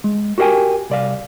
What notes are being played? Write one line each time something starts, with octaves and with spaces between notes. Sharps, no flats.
G#3
F#4 G4 A#4 D#5 G5 G#5
C2 D5 F5